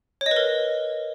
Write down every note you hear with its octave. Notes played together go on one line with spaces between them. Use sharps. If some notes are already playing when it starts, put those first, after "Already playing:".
C#5
D#5
B4
A#4